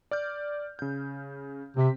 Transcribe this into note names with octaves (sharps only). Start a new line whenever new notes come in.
D5 F6 G6
C#3 G6
C3 C4 B6